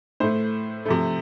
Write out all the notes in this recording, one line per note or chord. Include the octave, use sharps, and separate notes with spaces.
A2 A3 C5
C3 F3 A3